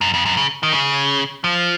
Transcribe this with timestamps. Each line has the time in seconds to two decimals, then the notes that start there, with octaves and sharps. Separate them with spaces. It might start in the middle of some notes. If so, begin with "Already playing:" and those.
0.01 F#2
0.14 F2
0.26 F#2
0.37 C#3
0.63 D#3
0.73 C#3
1.44 F3